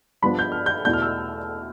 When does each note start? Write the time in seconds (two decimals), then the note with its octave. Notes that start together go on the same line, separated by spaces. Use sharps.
0.22 G2 F3 B3 D4 B5
0.39 G6
0.52 F6
0.66 G6
0.85 E2 B2 A3 E4 G6
0.93 F6
1.02 E6